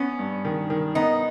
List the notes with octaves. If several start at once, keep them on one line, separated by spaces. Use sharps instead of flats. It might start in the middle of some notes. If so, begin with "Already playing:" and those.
Already playing: B3 C#4
G2
D#3
D#3
B3 D#4